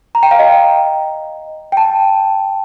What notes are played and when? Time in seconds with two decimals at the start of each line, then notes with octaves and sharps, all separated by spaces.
0.15 A#5
0.23 G5
0.31 F5
0.39 D#5
1.72 G5
1.77 A5